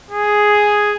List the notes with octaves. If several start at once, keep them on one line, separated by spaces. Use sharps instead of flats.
G#4